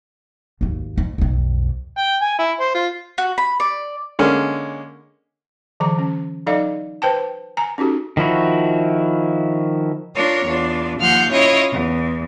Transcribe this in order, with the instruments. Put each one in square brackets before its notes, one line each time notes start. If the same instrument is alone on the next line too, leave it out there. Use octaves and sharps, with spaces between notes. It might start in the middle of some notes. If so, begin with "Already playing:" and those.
[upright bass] G#1 D#2
F2
B1 F2
[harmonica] G5
G#5
E4
C5
F4
[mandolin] F#4
B5
D5
[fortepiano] D3 G#3 A#3 C#4
[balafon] D3 E3 F#3 A#5
C#4
F#3 D#4 A4 D5 D#5 F5
B4 C5 G5 A5
G#5 A#5
C#4 D#4 F#4 G4 A4
[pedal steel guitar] D#3 F3 E4 F#4
[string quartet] D4 F4 A#4 C#5
E2 D4 F4
D#2 F3 F5 F#5 F6 G6
C#4 E4 F4 C#5 D#5 F5
E2